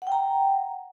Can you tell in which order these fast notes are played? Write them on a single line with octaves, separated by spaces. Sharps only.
F#5 G5 A#5